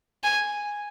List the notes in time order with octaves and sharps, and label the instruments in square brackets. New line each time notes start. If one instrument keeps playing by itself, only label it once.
[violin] G#5